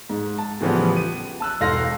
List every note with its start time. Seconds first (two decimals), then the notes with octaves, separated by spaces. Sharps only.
0.10 G#2
0.38 A5
0.60 A2 C#3 E3 F3 G3 B3
0.96 D#7
1.40 A5 E6 F#6
1.61 E1 A4 F5 C6 A#6